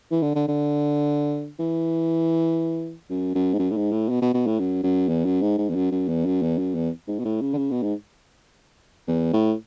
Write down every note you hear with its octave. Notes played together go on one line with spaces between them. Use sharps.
E3
D3
D3
D3
E3
F#2
F#2
G#2
F#2
A2
G#2
A2
B2
B2
B2
A2
F#2
F#2
E2
F#2
G#2
G#2
E2
F#2
F#2
E2
F#2
E2
F#2
E2
G#2
B2
A2
C#3
D3
C#3
B2
G#2
E2
A2